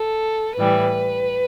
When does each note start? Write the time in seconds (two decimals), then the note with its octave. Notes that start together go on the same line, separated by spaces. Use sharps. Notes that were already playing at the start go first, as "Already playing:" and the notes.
Already playing: A4
0.57 A2 E3 G3 B4